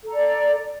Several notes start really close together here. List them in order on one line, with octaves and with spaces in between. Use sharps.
A4 A#5 D5